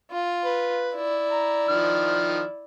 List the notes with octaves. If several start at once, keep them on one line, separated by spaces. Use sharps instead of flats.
F4
B4
E4 D5
A#5
D#3 F3 F6